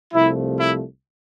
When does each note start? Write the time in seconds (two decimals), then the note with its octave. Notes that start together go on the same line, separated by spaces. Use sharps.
0.13 C2 C3 F3 A3 E4
0.57 E4